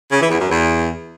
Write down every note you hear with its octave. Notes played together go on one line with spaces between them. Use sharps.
C#3
E3
E2
F#2
E2